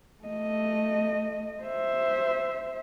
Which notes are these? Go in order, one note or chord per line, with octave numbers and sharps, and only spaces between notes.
A3 D#5
C5 E5